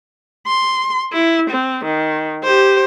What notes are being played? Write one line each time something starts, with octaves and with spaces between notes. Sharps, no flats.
C6
E4
C4
D#3
G4 C5